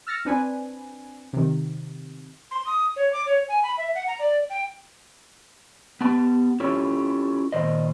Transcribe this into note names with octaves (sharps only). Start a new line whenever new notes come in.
E6 F6 A6 A#6 C#7
C4 D4 B4 G#5
C3 D#3
C6
D#6
C#5
D6
C#5
G#5
B5
E5
F#5
A#5
D5
G5
B3 G4 A5
C#4 E4 F4 G4 A4 C#5
A#2 D#3 C5 D#5